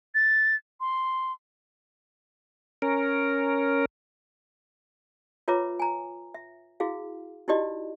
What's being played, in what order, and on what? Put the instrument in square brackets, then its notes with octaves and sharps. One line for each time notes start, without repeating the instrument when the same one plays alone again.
[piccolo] A6
C6
[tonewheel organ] C#4 A#4
[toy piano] F4 B4 C#5 E5 A#5 D6
G#5 A#5
E5
E4 F#4 G#4 F5
D#4 E4 F#4 G4 D5 D#5